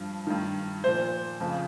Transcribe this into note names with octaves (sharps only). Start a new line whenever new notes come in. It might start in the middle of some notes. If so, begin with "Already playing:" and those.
Already playing: G2 F3
G2 D#3
A#2 F3 C5
F2 C#3 F3